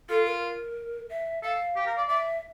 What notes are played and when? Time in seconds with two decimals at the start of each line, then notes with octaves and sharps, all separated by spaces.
0.09 F4 A4
0.26 A#4
1.09 E5
1.43 A4 F5
1.76 G4
1.87 A#4
1.98 D5
2.09 D5 E5